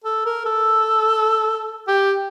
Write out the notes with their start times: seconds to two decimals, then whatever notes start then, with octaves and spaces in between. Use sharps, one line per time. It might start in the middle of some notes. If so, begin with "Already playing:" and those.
0.05 A4
0.26 A#4
0.46 A4
1.87 G4